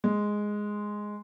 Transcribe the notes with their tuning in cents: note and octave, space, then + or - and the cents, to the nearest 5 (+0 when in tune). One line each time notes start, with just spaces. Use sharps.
G#3 +0